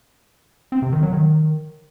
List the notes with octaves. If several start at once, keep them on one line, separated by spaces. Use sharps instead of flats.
C4
C3
D#3
F#3
D#3